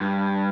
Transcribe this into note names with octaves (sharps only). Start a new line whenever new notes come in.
G2